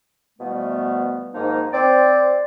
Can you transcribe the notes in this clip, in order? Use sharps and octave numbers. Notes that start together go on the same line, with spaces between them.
B2 E3 F3 G3 A3 B3
G#2 D#3 F3 A#3 D#4
C4 D5